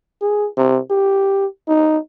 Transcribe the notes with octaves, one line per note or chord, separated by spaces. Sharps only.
G#4
C3
G4
D#4